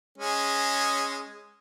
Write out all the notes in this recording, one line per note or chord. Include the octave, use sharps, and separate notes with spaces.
G#3 C#4 G#4